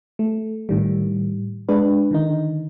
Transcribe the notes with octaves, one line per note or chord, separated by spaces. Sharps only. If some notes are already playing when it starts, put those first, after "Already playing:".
A3
A2 D#3 G3
G#3 D4 B4
D3 D#3 D#4